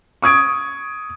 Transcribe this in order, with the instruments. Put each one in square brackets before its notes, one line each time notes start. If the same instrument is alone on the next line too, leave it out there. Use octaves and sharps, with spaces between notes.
[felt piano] C#6 D#6 G#6 D7